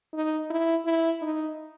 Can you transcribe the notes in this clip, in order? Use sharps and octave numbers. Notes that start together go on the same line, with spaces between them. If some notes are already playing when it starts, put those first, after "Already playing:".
D#4
E4
E4
D#4